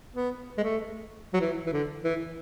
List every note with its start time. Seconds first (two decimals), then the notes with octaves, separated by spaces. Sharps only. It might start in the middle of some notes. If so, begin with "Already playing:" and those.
0.15 B3
0.58 G#3
0.63 A3
1.34 F#3
1.41 E3
1.66 E3
1.73 D3
2.04 E3